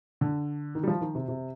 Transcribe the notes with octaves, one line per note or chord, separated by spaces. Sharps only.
D3
D#3
G3
F3
D#3
C3
C3